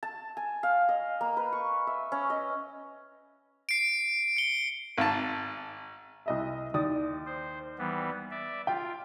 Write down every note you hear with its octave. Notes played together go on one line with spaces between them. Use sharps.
A5
G#5
F5
D#5
A#3
B4
C#6
E5
C#4
D#5
C7 D7
C#7 G7
G#1 A5
C2 D#5 E5
D#2 D5 D#6
C5
E3 G3 B3
D5 E5
F4 G5